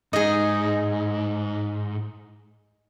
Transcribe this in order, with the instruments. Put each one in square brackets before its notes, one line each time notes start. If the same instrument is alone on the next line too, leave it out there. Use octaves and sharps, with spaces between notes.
[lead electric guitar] G#2 [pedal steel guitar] D#4 [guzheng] G#4 D#5